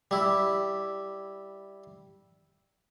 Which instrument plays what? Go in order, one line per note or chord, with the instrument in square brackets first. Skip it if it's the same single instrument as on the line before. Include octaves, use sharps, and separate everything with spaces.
[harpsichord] G3 E4